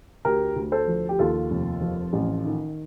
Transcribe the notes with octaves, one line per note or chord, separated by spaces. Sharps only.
D2 G4 A#4
D2
A4 C5
F3
G4
D#2 F4 A4
F1
F3
A1
D#3